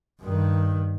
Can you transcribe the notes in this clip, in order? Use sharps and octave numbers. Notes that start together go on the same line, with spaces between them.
G2 D#3